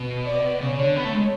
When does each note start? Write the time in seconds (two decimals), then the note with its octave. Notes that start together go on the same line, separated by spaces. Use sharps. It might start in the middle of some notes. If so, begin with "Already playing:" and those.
Already playing: B2
0.26 D5
0.61 C#3 C#5
0.79 D3
0.96 B3 C#5
1.05 A3
1.13 G#3